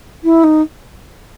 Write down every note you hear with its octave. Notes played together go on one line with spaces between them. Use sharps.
E4
D#4